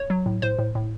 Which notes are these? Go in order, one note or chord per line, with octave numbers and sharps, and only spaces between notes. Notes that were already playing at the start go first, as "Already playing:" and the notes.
Already playing: C#5
F#3
A2
A2 C5
A2
A2